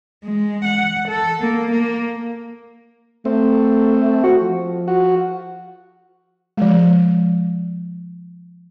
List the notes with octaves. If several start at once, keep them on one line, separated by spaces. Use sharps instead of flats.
G#3
F#5
A4
A#3
A#3
A3 C4
F#4
F3
F#4
F3 G#3